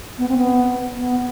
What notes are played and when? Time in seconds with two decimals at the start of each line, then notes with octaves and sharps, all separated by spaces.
0.18 B3
0.29 C4
0.38 B3
0.97 B3